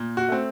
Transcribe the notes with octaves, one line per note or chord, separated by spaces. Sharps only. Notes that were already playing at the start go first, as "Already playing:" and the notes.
Already playing: A#2
F#4
A3 C4